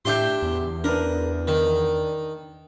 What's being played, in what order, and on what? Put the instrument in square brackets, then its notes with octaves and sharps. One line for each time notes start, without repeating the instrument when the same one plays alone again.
[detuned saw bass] A2 [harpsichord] D4 C6 [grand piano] G4 E5 G6
[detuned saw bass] E2
[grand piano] D4 B4 [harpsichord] A#4
[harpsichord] D#3